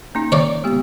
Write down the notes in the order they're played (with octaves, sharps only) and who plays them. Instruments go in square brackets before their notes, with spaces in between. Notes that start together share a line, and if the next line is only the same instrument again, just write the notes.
[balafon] A#3 C#4 D#4
[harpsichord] C#5 D5
[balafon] G#3 B3 G4